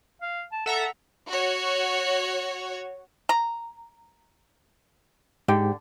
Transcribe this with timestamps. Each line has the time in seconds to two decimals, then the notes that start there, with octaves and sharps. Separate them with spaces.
0.22 F5
0.52 A5
0.66 A4 E5 F#5 A#5
1.28 F#4 C#5
3.29 A#5
5.48 G#2 D3 G4 G5